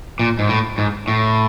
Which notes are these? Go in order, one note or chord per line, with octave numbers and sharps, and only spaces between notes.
A#2
G#2
A2
G#2
A2